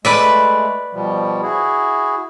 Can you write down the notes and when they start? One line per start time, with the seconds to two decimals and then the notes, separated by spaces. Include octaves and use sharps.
0.05 G#3 A3 B4 D5 E5
0.93 B2 F3 G3
1.42 E4 F#4 G#4